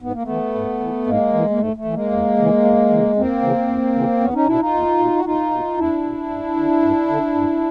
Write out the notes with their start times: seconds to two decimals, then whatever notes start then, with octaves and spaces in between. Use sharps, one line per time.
0.02 G#2 B3
0.13 A#3
0.22 A3 B3
0.28 E3
0.55 G#2
0.80 E3
1.06 G#2 G#3 A#3
1.33 E3
1.50 A#3
1.58 G#2 A3
1.76 A3
1.85 E3
1.94 G#3 A#3
2.12 E2
2.38 C#3 E3
2.64 E2
2.90 C#3 E3
3.16 E2 A#3 C4
3.42 C#3 E3
3.68 E2
3.95 C#3 E3
4.20 E2 B3 C#4
4.33 C#4 D#4
4.47 B2 D4 E4
4.59 D#4 F4
4.73 E2
4.99 B2
5.17 F#4
5.25 E2 D#4 F4
5.51 B2
5.78 E2 D4 E4
6.04 B2
6.30 G2
6.56 D3
6.82 G2
7.08 D3
7.35 G2